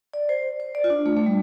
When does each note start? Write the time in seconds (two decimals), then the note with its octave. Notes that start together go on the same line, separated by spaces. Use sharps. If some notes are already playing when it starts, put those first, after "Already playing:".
0.14 D5
0.29 C5
0.60 C5
0.75 D5
0.84 F4
0.90 D4
1.06 A3
1.17 A3
1.26 G3